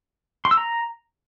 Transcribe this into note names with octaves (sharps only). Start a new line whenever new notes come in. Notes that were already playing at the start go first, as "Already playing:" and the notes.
C6
E6
A#5